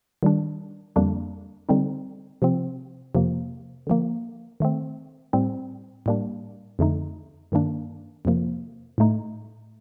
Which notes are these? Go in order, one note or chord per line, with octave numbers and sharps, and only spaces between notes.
D#3 G3 D4
F2 D3 G3 A#3 D4
D3 G3 C4 D#4
C3 F3 C4
F2 C3 F3 A#3
D3 F3 A#3
D#3 A3 C4
A2 G3 C4
A2 G3 A#3 D4
F2 D3 A3 D#4
G2 D#3 A#3 D4
F2 C3 F3 A#3
A2 A3 D#4